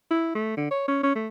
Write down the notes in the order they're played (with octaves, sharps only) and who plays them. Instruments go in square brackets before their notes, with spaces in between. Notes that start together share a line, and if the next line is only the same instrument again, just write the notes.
[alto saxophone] E4
A3
D3
C#5
C#4
C#4
A3